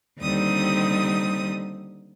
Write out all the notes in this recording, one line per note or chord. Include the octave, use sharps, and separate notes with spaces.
D#2 D3 G3 C4 D#4 D#6